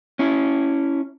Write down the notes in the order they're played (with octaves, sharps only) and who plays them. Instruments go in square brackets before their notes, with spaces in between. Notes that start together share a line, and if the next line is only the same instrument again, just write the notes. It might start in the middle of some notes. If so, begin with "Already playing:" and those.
[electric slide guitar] C#4 E4